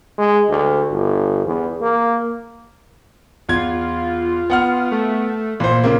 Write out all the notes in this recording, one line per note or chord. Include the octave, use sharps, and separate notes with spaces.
G#3
D2
G1
E2
A#3
E2 F4 G#6
B3 F#5 F6
A3
A#2 E3 C5
A#2 C#3 A#3